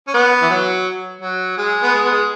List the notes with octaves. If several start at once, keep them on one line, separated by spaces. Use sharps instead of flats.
C#4
B3
E3
F#3
F#3
G#3
B3
G#3
B3
G#3